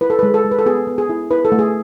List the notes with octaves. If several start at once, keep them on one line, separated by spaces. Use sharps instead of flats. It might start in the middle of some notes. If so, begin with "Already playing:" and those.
E4 B4
A4
G#3 B4
A4
G#3
B4
A4
B3 G#4
B3
G#4
E4
E4 B4
A4
A3
G#4